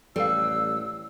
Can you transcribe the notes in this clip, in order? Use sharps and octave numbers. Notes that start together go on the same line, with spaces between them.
A1 G3 A4 B4 F5 E6